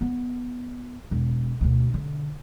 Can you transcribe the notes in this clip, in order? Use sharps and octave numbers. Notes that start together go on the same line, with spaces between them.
B3
E1
D2 B2
D3